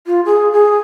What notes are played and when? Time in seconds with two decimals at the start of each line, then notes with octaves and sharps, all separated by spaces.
0.06 F4
0.25 G#4
0.52 G#4